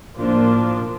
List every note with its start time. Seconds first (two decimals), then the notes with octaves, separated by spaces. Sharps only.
0.17 A2 F3 A#3 D4 F4
0.81 A#2